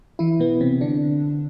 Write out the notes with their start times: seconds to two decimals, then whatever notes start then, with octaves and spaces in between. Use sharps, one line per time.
0.19 E3 E4
0.40 B2 B3
0.61 C3 C4
0.81 D3 D4